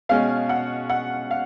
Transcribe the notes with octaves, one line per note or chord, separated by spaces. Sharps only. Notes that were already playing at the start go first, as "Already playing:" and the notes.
B2 G#3 C#4 F5
F#5
F#5
F5